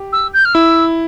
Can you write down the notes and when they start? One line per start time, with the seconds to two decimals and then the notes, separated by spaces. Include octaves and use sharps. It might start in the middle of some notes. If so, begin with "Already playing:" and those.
Already playing: G4
0.12 E6
0.33 G6
0.45 F6
0.54 E4 E6